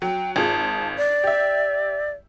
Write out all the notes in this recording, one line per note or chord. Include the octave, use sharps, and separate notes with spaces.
F#3 G5
G#1 F4 G#4 A5
D5
G4 E5